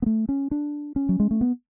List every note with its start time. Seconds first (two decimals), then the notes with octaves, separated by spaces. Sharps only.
0.02 B3
0.06 A3
0.29 C#4
0.51 D4
0.96 C#4
1.09 F#3
1.20 G#3
1.31 A3
1.41 B3